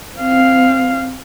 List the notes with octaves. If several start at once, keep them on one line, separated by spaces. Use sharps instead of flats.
C4 F5